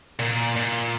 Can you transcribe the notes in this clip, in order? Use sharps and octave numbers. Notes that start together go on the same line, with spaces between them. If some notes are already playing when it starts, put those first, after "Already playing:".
A#2
A#2